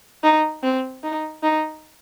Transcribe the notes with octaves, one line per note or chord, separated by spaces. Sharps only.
D#4
C4
D#4
D#4